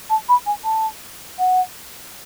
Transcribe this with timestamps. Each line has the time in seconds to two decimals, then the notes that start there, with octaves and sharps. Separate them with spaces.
0.09 A5
0.28 B5
0.46 G#5
0.64 A5
1.38 F#5